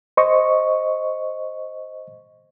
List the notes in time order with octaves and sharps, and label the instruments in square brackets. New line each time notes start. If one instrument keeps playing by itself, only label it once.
[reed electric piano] C5 D#5 C#6